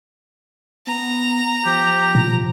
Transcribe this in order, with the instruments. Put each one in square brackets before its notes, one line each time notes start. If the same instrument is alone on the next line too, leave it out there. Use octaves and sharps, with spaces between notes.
[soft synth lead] B3 [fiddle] A#5
[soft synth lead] F3 [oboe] G4
[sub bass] A#2